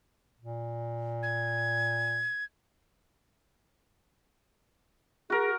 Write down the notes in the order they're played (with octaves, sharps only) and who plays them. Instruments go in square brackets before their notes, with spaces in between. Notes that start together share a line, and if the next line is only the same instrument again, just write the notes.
[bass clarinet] A#2
[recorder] G#6
[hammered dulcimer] F#4 A#4 [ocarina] G#4